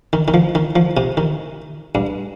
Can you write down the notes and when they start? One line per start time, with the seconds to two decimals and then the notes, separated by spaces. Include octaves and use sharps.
0.13 D#3
0.28 D#3
0.34 F3
0.55 D#3
0.76 F3
0.97 C3
1.17 D#3
1.95 G2